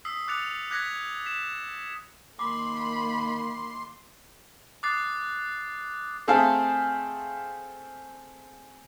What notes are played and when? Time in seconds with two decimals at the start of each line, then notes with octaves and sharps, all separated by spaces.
0.05 D#6 E6 B6 C7
0.28 D6 F#6 A6 C#7 F7
0.71 D6 F#6 G#6 A#6 B6 C#7
1.26 B6 E7 F7
2.39 D#3 A#3 B5 C6 D6
4.83 D6 D#6 F#6 A6 C7
6.28 A3 C4 G#4 A4 E5 F5